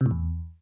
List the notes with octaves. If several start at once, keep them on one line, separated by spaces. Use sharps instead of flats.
C3
A2
E2